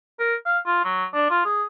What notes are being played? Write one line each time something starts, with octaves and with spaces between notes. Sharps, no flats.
A#4
F5
F4
F#3
D4
F4
G#4